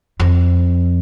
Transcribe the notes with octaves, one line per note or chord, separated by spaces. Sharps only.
F2